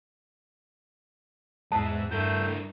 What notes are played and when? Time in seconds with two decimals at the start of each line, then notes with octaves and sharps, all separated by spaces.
1.72 E2 G#2 C5 E5 A5 F#6
2.12 G2 A3 E4 A#4 G6